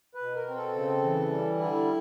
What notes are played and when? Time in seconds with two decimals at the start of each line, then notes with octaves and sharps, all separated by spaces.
0.15 B4
0.21 B2
0.35 A#4
0.48 C4
0.56 A4
0.75 C#3
1.03 E3
1.30 G3
1.58 D3 E4